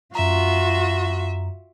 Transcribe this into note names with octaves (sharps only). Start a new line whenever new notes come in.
F#2 F4 F#4 E5 A#5